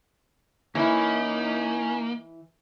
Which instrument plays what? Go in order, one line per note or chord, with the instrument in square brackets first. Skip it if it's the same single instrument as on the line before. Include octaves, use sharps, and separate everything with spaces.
[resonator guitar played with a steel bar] E3 E4 [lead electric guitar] A#3 [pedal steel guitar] C#4 [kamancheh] D#4